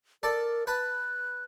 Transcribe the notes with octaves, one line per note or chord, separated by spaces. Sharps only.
A4 A#4 D5 A5
B4 A5 F#6